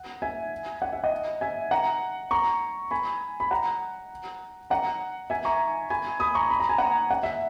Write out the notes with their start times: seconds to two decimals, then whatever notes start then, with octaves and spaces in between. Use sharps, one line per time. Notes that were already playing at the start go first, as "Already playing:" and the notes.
Already playing: F#5
0.22 E5 G#5
0.82 F#5
0.93 E5
1.04 D#5 F#5
1.41 E5 G#5
1.71 F#5 A#5
2.31 A#5 C#6
2.91 G#5 B5
3.40 B5
3.51 F#5 A#5
4.70 F#5 A#5
5.30 E5 G#5
5.45 A#5 C#6
5.90 G#5 B5
6.20 B5 D#6
6.35 A#5 C#6
6.50 B5
6.60 A#5
6.69 G#5
6.78 F#5 A#5
7.11 F#5
7.23 E5